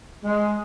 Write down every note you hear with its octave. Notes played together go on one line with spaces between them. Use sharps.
G#3